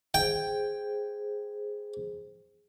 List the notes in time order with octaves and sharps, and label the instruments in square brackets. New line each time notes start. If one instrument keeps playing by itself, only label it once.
[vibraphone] G#4 C5 [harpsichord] G5